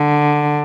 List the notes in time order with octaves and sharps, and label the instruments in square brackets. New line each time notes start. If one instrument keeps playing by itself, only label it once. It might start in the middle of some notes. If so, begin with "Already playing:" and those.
Already playing: [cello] D3